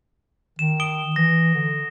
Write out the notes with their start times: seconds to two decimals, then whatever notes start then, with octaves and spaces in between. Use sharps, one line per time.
0.59 D#3 E7
0.80 D#6 D7 G7
1.16 E3 A#6
1.54 D3